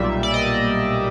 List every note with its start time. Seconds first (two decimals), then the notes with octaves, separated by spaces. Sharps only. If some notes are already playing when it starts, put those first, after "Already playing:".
Already playing: B1 A#2 G3 E5
0.23 D5
0.34 D#5